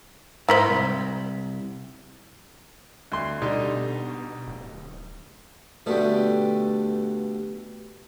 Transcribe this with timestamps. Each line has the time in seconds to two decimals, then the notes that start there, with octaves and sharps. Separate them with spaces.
0.49 G#2 E4 A#4 C5 B5
0.69 C2
3.12 D2 C6
3.42 B2 D3 G3 D#4
4.47 D1
5.86 G2 B2 D3 A3 G4